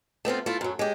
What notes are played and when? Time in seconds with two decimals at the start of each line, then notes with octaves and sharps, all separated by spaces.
0.25 A3 B3 C4 F4
0.46 A3 E4 F4
0.61 F#2 F#3
0.79 G#3 G4